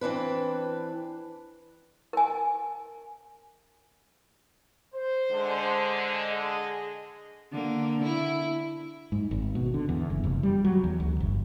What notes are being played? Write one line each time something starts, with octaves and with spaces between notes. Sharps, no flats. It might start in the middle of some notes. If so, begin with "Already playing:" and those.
E3 C4 D4 B4
A#4 G#5
C5
D3 G#3
G#4 D#5
D3 A#3
E4
G#2
G#1
B2
D3
E2
F#1
F1
G3
F#3
E2
D2
G1